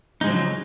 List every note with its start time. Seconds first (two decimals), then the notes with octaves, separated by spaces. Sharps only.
0.21 D#4
0.24 G#3
0.27 F3
0.29 F#3
0.32 C#3